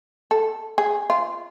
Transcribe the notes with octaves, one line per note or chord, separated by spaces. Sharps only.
A4
G#4
F4